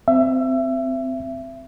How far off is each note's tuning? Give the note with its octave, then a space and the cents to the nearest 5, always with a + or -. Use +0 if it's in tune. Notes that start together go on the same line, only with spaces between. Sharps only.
C4 -20 E5 +25